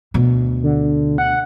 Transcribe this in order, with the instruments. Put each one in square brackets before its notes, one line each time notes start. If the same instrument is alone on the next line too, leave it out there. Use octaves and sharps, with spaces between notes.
[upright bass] D2 B2
[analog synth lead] D3
F#5